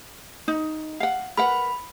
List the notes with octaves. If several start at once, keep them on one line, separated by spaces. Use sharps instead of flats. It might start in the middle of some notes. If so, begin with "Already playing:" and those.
D#4
F5 F#5
A#4 B4 F#5 B5